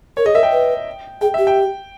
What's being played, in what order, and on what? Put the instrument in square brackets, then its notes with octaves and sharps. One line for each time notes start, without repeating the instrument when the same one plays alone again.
[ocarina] A#4 [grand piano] C#5
[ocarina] G#4 [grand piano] D#5
[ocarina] A#4 [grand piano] E5
[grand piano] G5
[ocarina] B4
[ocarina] G#4 [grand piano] G5
[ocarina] G4 [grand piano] E5
[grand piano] G5